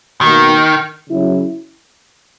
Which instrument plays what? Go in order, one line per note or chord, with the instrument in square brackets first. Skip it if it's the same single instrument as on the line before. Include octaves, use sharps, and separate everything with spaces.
[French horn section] B2 A#3 D#4 F#4 [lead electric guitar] D#3
[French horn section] C#3 F#3 C#4 E4